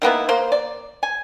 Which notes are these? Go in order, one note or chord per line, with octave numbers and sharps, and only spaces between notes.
D#3 A#3 B3 E4
A#3 C5
D5
G#5